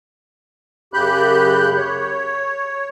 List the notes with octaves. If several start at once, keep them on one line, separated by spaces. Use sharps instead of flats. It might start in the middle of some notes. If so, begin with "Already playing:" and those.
F#2 C#3 G4 B5 F#6 G6
C#5